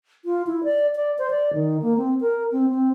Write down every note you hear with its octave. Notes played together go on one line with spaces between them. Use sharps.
F4
E4
D5
D5
C5
D5
D#3
A#3
C4
A#4
C4
C4